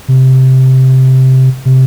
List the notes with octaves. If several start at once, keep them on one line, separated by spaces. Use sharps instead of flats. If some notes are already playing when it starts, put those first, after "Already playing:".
C3
C3